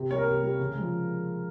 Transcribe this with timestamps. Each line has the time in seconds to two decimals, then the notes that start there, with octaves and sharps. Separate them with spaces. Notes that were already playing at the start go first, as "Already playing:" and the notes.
Already playing: C3
0.10 A#3 C#5
0.13 G3 A#4
0.27 C3
0.43 G3 A#3
0.59 C#3
0.76 F3 G#3